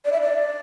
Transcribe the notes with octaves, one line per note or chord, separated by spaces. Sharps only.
D5
E5
D5